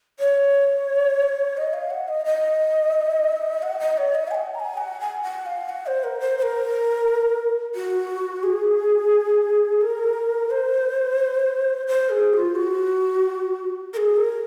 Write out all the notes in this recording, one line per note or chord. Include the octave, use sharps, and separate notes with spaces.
C#5
D#5
F5
F#5
D#5
D#5
F#5
D#5
C#5
D#5
F5
G#5
F#5
A#5
G#5
F#5
G#5
F#5
F5
F#5
C5
A#4
C5
C5
A#4
F#4
G#4
A#4
C5
C5
G#4
F#4
F4
F#4
A#4
G#4
A#4